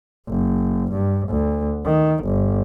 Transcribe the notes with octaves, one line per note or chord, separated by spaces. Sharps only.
F#1
G2
D2
D#3
G1